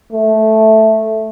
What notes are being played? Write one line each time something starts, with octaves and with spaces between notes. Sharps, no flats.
A3